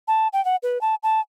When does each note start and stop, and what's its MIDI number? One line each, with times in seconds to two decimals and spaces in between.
0.08 0.28 81
0.33 0.43 79
0.45 0.56 78
0.63 0.81 71
0.81 0.95 81
1.03 1.21 81